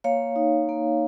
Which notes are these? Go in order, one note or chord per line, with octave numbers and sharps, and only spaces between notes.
A#3 C#5 F5
D#4
A#3